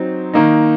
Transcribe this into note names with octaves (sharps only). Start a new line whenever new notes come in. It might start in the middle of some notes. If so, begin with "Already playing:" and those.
Already playing: F#3 C4 D#4
D#3 A#3 D#4